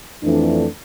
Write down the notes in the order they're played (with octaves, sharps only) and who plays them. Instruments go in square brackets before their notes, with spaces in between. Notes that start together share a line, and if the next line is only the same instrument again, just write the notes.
[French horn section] F2 E3 A3 D4